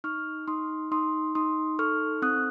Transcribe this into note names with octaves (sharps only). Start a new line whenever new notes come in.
D#4 C#6 F6
D#4 C6 D#6
D#4 C6 D#6
D#4 C6 D#6
A4 C#6 F6
C4 D#6 F#6